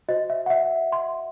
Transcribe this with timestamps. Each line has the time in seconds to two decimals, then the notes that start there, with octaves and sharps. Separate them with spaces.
0.08 F#4 C5 D#5
0.30 E5
0.46 F#5
0.50 E5
0.92 C6